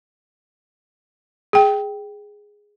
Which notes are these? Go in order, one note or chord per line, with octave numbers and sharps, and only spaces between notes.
G#4 G5